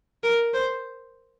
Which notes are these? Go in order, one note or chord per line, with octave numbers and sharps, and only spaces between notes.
A#4
C5